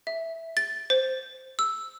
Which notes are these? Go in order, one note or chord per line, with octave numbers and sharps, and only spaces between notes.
E5
A6
C5
E6